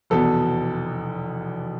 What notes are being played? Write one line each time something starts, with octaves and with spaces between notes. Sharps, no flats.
F1 E2 B2 B3 A4